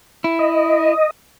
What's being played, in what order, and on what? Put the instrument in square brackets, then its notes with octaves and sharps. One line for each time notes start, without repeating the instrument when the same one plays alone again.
[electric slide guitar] E4
[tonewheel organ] D#5